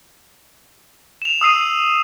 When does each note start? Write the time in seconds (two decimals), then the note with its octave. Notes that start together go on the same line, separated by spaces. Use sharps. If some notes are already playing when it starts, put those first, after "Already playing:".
1.22 E7 F7
1.41 D#6 E6 C7 D#7